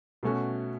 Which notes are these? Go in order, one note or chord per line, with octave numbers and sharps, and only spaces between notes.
B2 A3 C#4 F#4